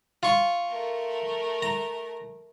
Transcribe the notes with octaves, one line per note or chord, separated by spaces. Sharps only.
F4 C#6
A3 A#4
A#5